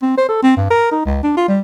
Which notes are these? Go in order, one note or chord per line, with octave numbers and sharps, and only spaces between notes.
C4
C5
A4
C4
G2
A#4
D#4
C#2
D4
F4
G3